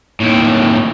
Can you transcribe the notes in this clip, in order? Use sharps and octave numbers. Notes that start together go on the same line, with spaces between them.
D#2 A2